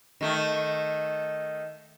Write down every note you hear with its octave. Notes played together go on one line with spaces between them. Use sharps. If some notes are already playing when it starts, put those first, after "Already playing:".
D#3 A3